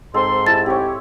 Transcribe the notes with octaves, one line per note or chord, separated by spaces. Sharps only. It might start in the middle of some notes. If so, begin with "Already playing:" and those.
G#2 C4 A4 C6
E4 G4 G5 A5 A6
C4 G4 C#5